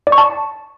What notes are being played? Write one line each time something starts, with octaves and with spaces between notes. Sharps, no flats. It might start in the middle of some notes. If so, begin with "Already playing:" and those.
D5
C#6
A5